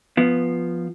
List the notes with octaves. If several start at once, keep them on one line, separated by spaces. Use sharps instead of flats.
F3 B3